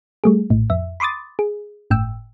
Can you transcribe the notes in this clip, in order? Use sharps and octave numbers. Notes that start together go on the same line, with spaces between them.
G3 A3 G#4
A#1 A2
F2 E5
B5 C6 D6 D#6 A6
G#4
G1 A2 G5 E6